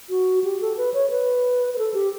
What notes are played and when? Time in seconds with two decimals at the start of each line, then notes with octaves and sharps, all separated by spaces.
0.10 F#4
0.44 G4
0.61 A4
0.77 B4
0.94 C#5
1.11 B4
1.74 B4
1.78 A4
1.94 G4